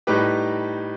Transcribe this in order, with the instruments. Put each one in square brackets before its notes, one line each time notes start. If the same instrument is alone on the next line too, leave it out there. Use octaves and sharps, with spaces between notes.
[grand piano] A2 G3 D#4 G4 B4